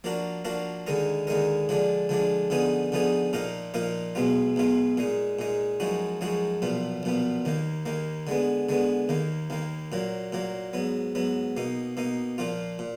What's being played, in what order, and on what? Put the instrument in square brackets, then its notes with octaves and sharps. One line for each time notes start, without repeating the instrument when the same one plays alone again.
[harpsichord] F3 A#3 D4 F#4 A#4
F3 A#3 D4 F#4 A#4
D#2 D3 G#3 D#4 A#4
D#2 D3 G#3 D#4 A#4
D3 F3 G#3 D4
D3 F3 G#3 D4
D3 F3 B3 D#4 G#4
D3 F3 B3 D#4 G#4
A#2 F3 A#3 D#4 A#4
A#2 F3 A#3 D#4 A#4
B1 B2 G#3 B3 F4
B1 B2 G#3 B3 F4
A#2 G#3 D#4
A#2 G#3 D#4
F#2 F3 G#3 D#4 F#4
F#2 F3 G#3 D#4 F#4
B1 A#2 F3 B3
B1 A#2 F3 B3
D#2 D#3 A#3
D#2 D#3 A#3
D3 G#3 B3
D3 G#3 B3
D#2 D#3 A#3
D#2 D#3 A#3
A#2 F#3 A#3
A#2 F#3 A#3
G#2 F#3 B3
G#2 F#3 B3
B2 A#3 D#4
B2 A#3 D#4
A#2 F3 A#3 F4
A#2